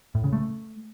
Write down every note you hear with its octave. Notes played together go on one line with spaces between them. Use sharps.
A2
C#3
A3